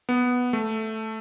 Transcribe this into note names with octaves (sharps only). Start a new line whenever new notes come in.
B3
A3